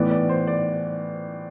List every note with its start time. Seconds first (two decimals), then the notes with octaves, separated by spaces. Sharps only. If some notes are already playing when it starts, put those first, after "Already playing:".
Already playing: A2 E3 B3 D5
0.11 D5
0.29 C5
0.47 D5